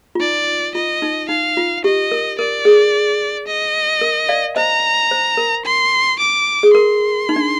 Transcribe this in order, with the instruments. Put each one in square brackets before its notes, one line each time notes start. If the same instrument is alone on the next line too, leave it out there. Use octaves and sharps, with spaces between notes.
[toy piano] F4
[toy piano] D#4 [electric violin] D5
[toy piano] F4 [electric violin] D#5
[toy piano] D#4
[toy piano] D#4 [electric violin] F5
[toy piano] F4
[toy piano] G4 [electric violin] D#5
[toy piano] A#4
[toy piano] A#4 [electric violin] D5
[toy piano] G#4
[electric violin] D#5
[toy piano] A#4
D5 F5
[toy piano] C5 D#5 [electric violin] A#5
[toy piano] C5
A#4
[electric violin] C6
D6
[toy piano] G#4
[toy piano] A#4 [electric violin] C6
[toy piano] D#4
D4